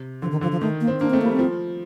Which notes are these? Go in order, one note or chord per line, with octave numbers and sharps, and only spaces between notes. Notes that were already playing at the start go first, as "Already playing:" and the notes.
Already playing: C3
D3 F3
D#3
D3 F3
F3
D#3 A3
A#3
C4
A#3 D4
A3 C4
G3 A#3
C4
F3